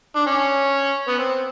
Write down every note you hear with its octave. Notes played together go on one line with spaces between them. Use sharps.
D4
C#4
B3
C4